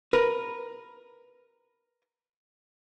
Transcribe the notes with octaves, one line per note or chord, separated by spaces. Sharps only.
A#4 B4